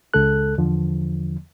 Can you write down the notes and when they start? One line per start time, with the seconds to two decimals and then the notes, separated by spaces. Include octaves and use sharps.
0.14 C#2 C#3 G#3 A4 F#6
0.58 E2 D3 F3